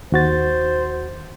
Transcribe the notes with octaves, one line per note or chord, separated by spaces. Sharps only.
D#2 F#4 C5 A6